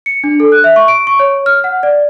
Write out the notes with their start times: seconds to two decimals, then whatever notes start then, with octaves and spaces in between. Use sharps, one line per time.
0.06 C#7
0.24 D4
0.40 A4
0.52 F#6
0.64 E5
0.76 C#6
0.88 D7
1.07 C#6
1.19 C#5
1.46 F6
1.64 F#5
1.83 D5